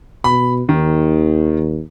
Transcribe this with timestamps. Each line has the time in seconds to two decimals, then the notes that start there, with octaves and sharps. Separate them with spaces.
0.24 B2 B5
0.69 D#2 D#3